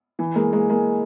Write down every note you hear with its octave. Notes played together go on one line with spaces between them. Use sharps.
E3
G#3 A#3
G#3 A#3
G#3 A#3